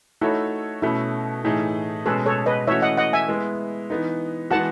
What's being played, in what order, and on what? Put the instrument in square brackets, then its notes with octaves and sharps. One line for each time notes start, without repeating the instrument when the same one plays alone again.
[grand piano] A3 D#4 F#4 A4 C#5 [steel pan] E4
[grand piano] B2 A3 C#4 [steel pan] E4
[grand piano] A2 E3 A3 D#4 G#4
[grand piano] B2 G#3 C#4 G#4 B4 [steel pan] A4
[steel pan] A4 C#5
B4 D#5
[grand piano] E3 A3 C#4 F#4 [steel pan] C#5 E5
[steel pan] D#5 F#5
D#5 F#5
E5 G#5
[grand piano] G#3 B3 E4
E3 B3 D#4
[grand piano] E3 G#3 B3 F#4 [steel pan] F#5 A5